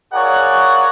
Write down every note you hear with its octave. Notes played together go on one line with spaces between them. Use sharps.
F4 G#4 A#4 C#5 D5 F#5